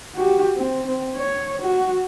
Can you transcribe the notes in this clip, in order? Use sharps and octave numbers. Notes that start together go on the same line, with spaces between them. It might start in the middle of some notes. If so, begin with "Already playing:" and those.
F#4 G4
C4
C4
C#5
F#4